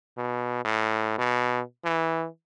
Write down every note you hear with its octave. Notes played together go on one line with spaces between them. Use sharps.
B2
A2
B2
E3